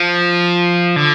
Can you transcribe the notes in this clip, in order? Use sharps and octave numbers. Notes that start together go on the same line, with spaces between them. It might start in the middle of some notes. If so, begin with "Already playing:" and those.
Already playing: F3
D3